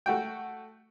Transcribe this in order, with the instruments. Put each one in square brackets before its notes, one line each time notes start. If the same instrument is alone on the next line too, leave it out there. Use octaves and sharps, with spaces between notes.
[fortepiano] A3 F#4 G5